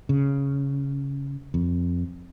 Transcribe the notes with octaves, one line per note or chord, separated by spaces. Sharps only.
C#3
F2